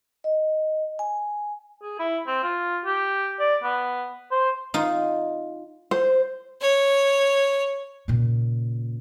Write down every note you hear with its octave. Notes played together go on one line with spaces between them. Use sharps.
D#5
G#5
G#4
E4
C4
F4
G4
D5
B3
C5
D#4 F4
C5
C#5
A#2 C#3